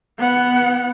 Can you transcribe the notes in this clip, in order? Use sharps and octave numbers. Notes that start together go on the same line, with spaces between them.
B3 F#5